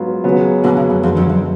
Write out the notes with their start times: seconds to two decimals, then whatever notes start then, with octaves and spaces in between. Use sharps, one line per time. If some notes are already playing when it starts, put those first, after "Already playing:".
Already playing: G#2 F#3 B3 F4
0.24 C#3 F#3 B3
0.63 B2 D3
0.77 C#3
0.90 F#2
1.03 F2 D3 G#3 B3 F#4
1.17 F2
1.29 F#2